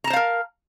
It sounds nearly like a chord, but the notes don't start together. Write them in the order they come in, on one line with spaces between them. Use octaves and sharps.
A#5 A5 C5 F5 A#4